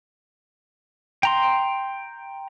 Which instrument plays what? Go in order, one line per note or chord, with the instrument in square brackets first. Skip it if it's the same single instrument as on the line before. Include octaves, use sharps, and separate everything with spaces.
[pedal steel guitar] G5 A#5 C6